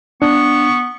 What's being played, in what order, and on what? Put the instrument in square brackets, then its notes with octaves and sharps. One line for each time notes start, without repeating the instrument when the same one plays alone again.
[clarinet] B3 [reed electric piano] D4 [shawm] C#6